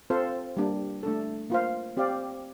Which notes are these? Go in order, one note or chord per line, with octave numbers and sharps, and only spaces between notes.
C4 F4 A4 C5 F5
G3 A#3 D4
A3 D4 A4
A#3 F4 C5 F5
C4 G4 D5 F5